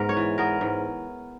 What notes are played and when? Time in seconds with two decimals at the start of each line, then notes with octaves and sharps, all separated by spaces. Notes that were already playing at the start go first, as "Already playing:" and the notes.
Already playing: G#2 B3 A#4
0.09 C#5
0.17 E3
0.38 B3 A#4
0.61 G#2